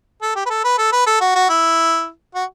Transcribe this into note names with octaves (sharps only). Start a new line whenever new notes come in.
A4
G4
B4
A4
B4
A4
B4
A4
F#4
F#4
E4
F#4